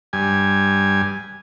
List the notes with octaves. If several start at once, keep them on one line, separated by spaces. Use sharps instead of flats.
G2 G#5